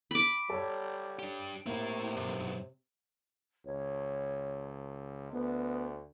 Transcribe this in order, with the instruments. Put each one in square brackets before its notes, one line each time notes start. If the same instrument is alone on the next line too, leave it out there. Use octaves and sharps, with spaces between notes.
[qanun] B5 D6
[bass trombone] G3 [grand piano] A4 C#5
[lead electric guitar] D4 G4
[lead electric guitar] A2 E4 [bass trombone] C3 [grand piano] A#3
[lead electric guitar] B1 G2
[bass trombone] C#2 [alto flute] C#5
[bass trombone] D2 [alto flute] B3